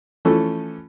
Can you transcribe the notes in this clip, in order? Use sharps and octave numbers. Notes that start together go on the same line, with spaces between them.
E3 F3 A3 C#4 A4